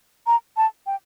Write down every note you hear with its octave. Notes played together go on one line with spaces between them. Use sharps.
A#5
A5
G5